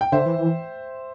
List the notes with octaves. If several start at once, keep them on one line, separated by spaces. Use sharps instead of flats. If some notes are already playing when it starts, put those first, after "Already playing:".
G5
D3 C5 E5
E3
E3